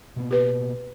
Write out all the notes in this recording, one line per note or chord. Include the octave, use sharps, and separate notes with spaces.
B2 A#3 B3
G4 B4